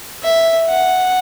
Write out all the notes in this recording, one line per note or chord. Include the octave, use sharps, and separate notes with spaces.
E5
F#5